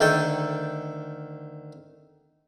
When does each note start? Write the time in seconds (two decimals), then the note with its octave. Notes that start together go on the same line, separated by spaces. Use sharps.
0.01 D2 D#3 A4 G5